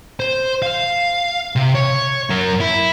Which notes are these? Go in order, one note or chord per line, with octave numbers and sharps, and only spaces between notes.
C5
F5
C3
C#5
F#2 A#4
E4